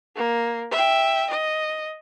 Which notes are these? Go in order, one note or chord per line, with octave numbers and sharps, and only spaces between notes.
A#3
E5 G5
D#5